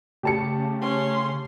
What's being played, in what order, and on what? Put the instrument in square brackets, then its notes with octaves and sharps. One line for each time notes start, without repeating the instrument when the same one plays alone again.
[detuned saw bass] C#3 [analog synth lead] A3 [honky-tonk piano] G4 A5 C#7
[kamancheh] C#4 C6